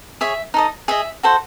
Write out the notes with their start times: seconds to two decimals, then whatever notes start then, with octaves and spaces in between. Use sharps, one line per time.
0.21 G#4 C#5 E5
0.54 D#4 A4 D#5
0.88 G#4 D#5 E5
1.23 F#4 A4 C5